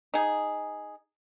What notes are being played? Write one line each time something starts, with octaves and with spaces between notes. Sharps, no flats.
D#4 G#4